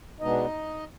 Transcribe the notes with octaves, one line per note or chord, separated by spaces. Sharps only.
B2 G#3 B3 D4 D#4 D#5